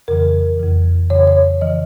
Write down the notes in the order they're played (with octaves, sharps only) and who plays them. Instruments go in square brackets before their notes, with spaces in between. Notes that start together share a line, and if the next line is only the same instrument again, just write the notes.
[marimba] F2 C#3 E3 A#4
F2 C#3 E3
F2 C#3 E3 C#5
C#5
C#3 E3 D#5